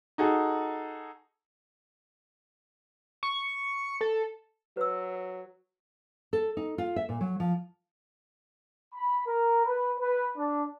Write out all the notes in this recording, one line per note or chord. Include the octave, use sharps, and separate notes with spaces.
D#4 F#4 G#4 A4
C#6
A4
F#3 B4 E6
A4
D#4
F4
E5
A#2
F#3
F3
B5
A#4
B4
B4
D4